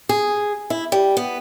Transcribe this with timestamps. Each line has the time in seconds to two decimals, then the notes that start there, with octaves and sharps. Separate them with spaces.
0.09 G#4
0.70 E4
0.92 G3
1.17 B3